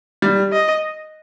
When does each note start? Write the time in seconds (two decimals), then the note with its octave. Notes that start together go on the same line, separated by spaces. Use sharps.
0.22 G3
0.53 D#5